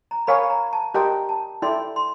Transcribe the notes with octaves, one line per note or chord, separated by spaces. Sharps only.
A#5
A#4 C#5 F5 G#5 B5
A#5
A5
G4 A#4 D#5 G5 A#5 C6
A5
E4 A4 D5 G5 C6
C6